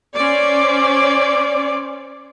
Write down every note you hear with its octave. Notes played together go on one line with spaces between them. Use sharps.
C#4 C5 D5